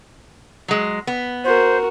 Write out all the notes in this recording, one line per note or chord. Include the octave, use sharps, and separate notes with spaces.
F#3 G#3
B3
F#4 A#4 C5